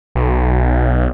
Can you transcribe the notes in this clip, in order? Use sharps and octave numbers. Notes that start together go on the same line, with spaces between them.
B1